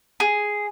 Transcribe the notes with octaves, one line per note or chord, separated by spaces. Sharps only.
G#4